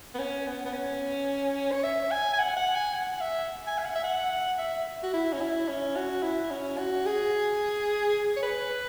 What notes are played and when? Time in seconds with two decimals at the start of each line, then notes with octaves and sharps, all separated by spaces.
0.15 B3
0.19 C#4
0.47 B3
0.65 B3
0.73 C#4
1.72 C#5
1.84 E5
2.11 G#5
2.33 G#5
2.39 F#5
2.57 F#5
2.75 G#5
2.94 F#5
3.21 E5
3.67 G#5
3.78 E5
3.85 F#5
3.96 E5
4.04 F#5
4.59 E5
5.03 F#4
5.13 E4
5.33 C#4
5.41 E4
5.69 C#4
5.96 F#4
6.23 E4
6.51 C#4
6.78 F#4
7.06 G#4
8.37 C#5
8.43 B4